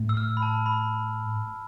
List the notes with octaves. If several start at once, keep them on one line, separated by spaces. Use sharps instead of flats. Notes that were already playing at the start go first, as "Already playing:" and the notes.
Already playing: A2
E6
F6
B5
A5
B5